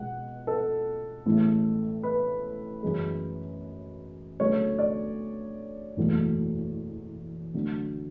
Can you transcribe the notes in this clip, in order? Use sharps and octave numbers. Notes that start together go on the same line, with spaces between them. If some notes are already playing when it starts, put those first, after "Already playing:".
Already playing: C#2 B2 G#3 F#5
A4
A1 A2 G#3
B4
F#2 C#3 E3 G#3
D2 C#3 F#3 A3 C#5
D5
F#1 E2 B2 F#3 A3
D2 D3 F#3